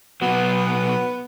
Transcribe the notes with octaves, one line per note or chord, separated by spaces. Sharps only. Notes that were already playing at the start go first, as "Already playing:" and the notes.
B2 F#3 B3